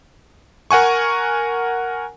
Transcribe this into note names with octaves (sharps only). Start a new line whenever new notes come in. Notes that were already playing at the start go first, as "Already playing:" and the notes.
A#4 F#5 G#5 C#6